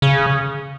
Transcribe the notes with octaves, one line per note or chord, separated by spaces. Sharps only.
C#3